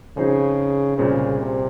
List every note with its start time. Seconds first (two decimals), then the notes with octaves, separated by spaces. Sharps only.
0.17 C#3 F3 C4 D#4 G#4 C5
0.98 C2 A#2 C#3 G#3 C4
1.39 C3